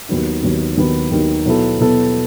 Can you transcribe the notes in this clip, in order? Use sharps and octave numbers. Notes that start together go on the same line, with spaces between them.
D#2 D#3 F#3 B3 D#4
D#2 D#3 F#3 B3 D#4
D#2 D#3 F#3 B3 D#4
D#2 D#3 F#3 B3 D#4
B2 F#3 B3 E4 A4
B2 F#3 B3 E4 A4